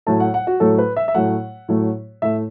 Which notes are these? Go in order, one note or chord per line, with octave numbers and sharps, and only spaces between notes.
A2 F#3 A3 A5
F#5
F#5
F#4
A2 F#3 A3 A4
B4
E5
E5
A2 F#3 A3 F#5
A2 F#3 A3
A2 A3 E5